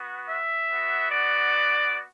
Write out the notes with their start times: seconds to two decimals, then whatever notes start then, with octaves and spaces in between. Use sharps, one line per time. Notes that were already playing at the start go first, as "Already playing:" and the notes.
Already playing: B3 F#4
0.29 E5
0.70 B3 F#4
1.11 D5